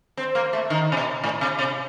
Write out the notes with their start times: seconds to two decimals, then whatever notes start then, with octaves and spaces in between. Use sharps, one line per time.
0.17 C4
0.35 A#3
0.53 A3
0.70 D#3
0.92 C3
0.97 B2
1.24 A2
1.41 C3
1.59 C3